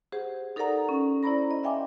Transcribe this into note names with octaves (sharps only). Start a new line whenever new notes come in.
G4 G#4 C5 F#5
D#4 A4 A#4 D5 F#5 A#5
C#4
E4 C5 D5 A#5 B5 A#6
D#5
E5 F5 G5 G#5 C6 D6